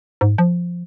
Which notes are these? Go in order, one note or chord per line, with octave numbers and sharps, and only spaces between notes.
G#2
F3